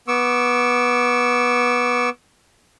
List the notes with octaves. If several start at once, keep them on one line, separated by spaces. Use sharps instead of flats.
B3 C#6 D6 E6